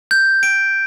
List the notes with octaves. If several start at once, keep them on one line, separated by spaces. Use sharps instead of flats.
G6
D7